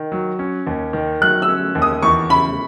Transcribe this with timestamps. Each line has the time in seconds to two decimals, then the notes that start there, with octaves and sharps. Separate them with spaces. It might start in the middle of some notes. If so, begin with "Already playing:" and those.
Already playing: D#3
0.12 F#3
0.39 C#4
0.67 D#2
0.93 D#3
1.21 F#3 F#6
1.42 E6
1.49 C#4
1.75 D#2
1.82 D#6
2.02 E2 C#6
2.30 C#3 B5